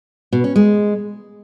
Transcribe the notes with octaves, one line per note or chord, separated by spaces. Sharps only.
B2
C#4
G#3